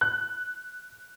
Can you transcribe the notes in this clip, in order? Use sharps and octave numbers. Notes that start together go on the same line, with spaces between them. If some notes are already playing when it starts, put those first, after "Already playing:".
F#6